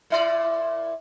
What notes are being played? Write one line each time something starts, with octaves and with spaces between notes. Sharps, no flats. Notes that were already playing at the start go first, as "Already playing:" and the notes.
A#2 E4 D5